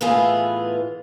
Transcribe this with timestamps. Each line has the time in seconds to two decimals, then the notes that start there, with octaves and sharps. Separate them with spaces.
0.01 A2 E3 B3 F4 G#4